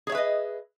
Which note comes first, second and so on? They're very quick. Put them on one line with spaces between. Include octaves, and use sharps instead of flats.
G#4 C#5 E5 B4 D#5